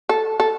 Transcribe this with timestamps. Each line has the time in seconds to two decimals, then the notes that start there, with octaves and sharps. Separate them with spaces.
0.09 A4
0.40 A4